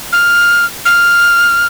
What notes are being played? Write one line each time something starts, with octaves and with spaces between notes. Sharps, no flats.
F6
F6